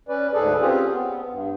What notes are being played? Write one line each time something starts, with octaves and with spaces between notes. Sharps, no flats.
C#4 B4 D5
D2 G#2 G#4 A4 B4 D5
C4 C#4 F4 G4 G#4
B3
G2